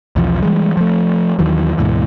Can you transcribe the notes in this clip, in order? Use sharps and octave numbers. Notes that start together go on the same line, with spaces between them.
B1 E2 F3
E3 G3 G#3
F3 A3
D#2 D#3 E3 F#3
D2 G#2 B2 E3